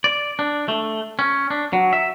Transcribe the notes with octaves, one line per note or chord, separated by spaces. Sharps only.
D5
D4
A3
C#4
D4
F#3
E5